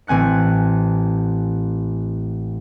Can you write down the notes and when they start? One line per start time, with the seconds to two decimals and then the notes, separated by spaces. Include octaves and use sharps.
0.07 A1 C4 G#5 F#6 C#7